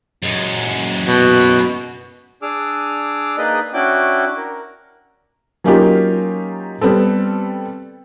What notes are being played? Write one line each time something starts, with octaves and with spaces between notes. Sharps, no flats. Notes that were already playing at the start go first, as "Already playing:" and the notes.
F#2 G#3
B2
D4 G#4 D6 E6 F6
A#3 D#4 G#4 B4 D5 D#5
C#4 D4 E4 F#4 G5 D6
A#4
F#3 A#3 C#4 D#4 F4 G4
G3 B3 C4 A4